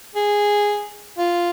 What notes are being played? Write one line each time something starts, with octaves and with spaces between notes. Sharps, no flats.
G#4
F4